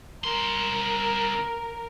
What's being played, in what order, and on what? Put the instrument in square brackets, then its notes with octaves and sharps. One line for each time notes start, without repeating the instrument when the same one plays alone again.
[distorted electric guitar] C2 C6 [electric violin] A#4